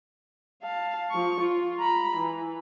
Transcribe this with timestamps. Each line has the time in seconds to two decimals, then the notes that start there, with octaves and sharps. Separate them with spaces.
0.63 F5 A5
1.11 F3 C#6
1.41 F4
1.80 A#5 B5
2.17 E3